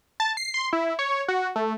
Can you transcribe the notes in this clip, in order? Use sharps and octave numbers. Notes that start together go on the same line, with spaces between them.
A5
C7
C6
E4
C#5
F#4
A3